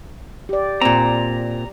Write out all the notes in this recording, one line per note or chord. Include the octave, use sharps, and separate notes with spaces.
G4 D5
A#2 C4 A#5